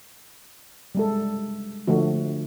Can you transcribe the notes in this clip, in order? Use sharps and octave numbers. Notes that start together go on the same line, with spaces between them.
G3 G#3 A4
D3 F3 A3 F#4